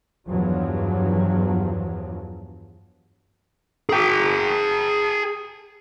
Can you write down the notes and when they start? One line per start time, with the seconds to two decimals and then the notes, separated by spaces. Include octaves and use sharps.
0.27 E2 G2 F3 F#3
3.89 G#4 G5